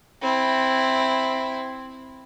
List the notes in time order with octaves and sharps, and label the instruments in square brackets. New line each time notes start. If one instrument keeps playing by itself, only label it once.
[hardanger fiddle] C4 E4